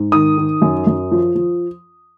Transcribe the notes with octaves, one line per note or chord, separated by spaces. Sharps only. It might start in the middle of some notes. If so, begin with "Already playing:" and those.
Already playing: G#2
D#3 D#6
D#3
F#2
F#2
F3
F3